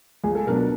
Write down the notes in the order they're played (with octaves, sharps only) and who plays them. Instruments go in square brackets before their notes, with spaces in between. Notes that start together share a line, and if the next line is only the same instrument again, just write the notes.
[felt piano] C#2 [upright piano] G#4
[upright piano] A4
[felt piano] B2 F#3 B3 D4 [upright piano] A#4
[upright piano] A#4